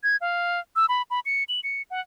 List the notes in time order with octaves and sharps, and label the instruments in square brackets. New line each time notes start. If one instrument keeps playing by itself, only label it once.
[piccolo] G#6
F5
E6
B5
B5
C#7
F#7
C#7
F#5